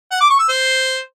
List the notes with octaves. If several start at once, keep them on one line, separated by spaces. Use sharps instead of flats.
F#5
D6
C#6
E6
C5